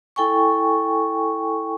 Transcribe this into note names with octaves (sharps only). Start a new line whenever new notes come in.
E4 A4 G5 G#5 C#6